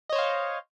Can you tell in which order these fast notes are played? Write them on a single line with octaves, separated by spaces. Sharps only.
D#5 C#5 C5 F5